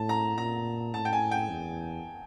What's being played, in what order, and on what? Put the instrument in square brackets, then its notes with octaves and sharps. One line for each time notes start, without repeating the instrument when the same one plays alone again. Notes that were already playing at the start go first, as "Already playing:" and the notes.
Already playing: [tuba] A2 [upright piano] A5
[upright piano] A#5
[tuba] A#2 [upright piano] A#5
[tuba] A2 [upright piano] A5
[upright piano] G5
G#5
G5
[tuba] E2